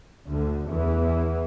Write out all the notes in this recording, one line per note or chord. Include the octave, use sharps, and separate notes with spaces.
D2 D3
E2 E3